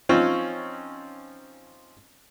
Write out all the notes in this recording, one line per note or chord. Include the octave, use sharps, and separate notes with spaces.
F3 C4 C#4 D#4 F4